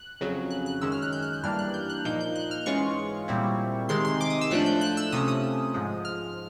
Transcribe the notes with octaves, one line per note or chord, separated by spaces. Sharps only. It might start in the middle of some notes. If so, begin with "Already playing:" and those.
Already playing: F#6
F2 C#3 F#3
F#6
F#6
F#2 D#3 G#3 C#4 E6
F6
F#6
G6
F#6
F#6
G2 E3 G3 A#3 D4 F6
F#6
G6
F#6
A#2 F3 A#3 D#4 G6
G6
F#6
F6
G#2 E3 G#3 C#4 F4 C#6
A#2 G3 C4 E4
C3 D#3 G#3 C6
C6
D6
D#6
E6
A2 F3 A3 D4 F#6
G6
F#6
E6
C3 F3 A3 C#4 D#6
D#6
G#2 F3 G#3
F6